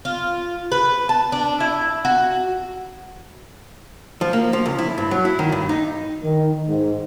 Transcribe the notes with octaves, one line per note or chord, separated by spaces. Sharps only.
F4
B4
A5
D4
E4
F#4
F3
A#3
F3
C#2
E4
G2
F#3
E4
D#3
G2
D#4
D#3
G#2